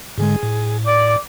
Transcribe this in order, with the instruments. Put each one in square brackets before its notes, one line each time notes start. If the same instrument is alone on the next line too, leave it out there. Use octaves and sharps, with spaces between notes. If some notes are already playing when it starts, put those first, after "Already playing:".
[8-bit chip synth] G#2 D3 G#3 [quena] G#4
[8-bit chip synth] A2
[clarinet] D5 [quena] D6